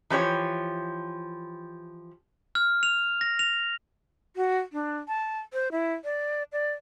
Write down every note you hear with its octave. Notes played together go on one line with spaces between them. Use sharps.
E3 F3 G4 C#5
F6
F7
A#6
F7
F#4
D4
A5
C5
E4
D5
D5